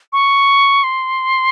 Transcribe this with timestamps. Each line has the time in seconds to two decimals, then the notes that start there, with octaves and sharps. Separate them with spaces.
0.13 C#6
0.84 C6